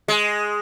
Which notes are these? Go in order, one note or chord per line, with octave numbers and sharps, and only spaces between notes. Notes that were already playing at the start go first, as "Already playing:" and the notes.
G#3